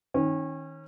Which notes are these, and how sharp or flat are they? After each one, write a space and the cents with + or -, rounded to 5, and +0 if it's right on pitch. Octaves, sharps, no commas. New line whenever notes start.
D#3 +20 C#4 -30